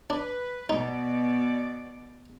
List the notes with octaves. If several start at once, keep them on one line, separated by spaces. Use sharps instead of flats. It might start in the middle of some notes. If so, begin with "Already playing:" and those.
D4 B4
B2 D#4 D5